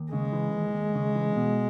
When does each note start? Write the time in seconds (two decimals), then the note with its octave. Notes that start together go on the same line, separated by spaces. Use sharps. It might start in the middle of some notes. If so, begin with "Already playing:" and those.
Already playing: D#2
0.12 C#3 G#3
0.33 E3
0.53 D#2
0.74 D#2
0.95 C#3
1.15 E3
1.36 B2